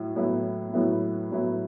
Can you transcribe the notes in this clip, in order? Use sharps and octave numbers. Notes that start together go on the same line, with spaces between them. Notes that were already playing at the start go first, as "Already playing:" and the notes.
Already playing: A2 F#3 E4
A2 F#3 B3 E4
A2 F#3 B3 E4
A2 F#3 B3 E4